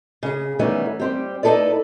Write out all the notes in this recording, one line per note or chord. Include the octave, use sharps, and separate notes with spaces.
C#3 G#4
D#3 E3 G3 A3 B3 C#4
G3 C4 G4
D#4 E4 G#4 A4 B4 D5